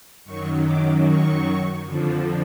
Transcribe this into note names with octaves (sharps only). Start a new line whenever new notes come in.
F#2 D#3 F#3 C#6
D6
C#6
F2 D3 F3